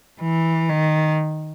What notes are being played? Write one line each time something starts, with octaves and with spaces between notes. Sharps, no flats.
E3
D#3